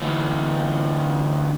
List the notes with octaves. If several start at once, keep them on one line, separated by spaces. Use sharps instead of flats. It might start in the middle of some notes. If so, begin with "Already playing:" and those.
D2 E3